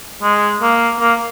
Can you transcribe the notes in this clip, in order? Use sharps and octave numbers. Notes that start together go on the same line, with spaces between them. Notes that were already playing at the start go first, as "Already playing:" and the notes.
G#3
A#3
A#3